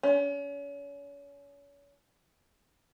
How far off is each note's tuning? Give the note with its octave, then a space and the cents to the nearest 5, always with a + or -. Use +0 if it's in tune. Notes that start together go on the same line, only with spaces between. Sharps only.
C#4 +35